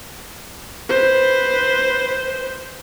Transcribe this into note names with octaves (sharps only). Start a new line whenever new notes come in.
B4 C5